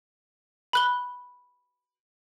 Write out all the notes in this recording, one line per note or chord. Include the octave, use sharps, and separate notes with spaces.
B5 F#6 G7